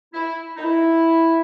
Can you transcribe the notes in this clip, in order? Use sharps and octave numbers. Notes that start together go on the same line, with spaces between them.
E4
D#4
E4